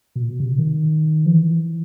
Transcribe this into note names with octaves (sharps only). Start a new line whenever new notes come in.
B2
A#2
B2
C3
D#3
F3
E3